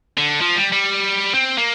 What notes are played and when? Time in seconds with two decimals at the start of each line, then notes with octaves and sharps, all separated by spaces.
0.18 D3
0.42 F3
0.56 G3
0.72 G3
1.34 C4
1.58 A#3